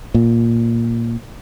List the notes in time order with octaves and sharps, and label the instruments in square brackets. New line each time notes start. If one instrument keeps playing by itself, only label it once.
[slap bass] A#2